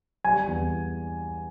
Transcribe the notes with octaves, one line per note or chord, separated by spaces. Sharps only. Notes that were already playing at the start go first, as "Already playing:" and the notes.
G3 G#5
E2